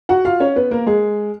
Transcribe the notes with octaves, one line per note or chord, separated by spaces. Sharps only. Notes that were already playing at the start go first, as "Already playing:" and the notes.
F#4 F#5
F4 F5
C#4 C#5
B3 B4
A#3 A#4
G#3 G#4